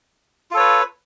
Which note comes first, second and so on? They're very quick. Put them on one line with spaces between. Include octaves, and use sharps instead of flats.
F4 A4 C#5 B4